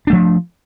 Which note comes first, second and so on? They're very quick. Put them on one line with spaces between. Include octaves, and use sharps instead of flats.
D4 A3 F3